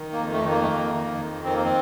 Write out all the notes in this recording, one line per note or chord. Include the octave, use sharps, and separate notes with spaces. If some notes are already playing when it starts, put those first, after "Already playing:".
Already playing: D#3
A#3
F2
A3
D#3
A#3
A3
F2 A#3
D#3
F2
D#3 C4
A#3
C4